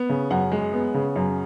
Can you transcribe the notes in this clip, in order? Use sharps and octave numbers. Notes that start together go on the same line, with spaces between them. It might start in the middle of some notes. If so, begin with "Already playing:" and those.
Already playing: B3
C#3
F#2 F#5
G#3
B3
C#3
F#2